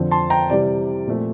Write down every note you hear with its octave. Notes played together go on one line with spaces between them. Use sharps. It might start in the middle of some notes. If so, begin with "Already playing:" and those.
Already playing: F2 D3 F3 C4
A5 C6
G5 A#5
C3 E3 G3 D5
A#2 F3 A3 C4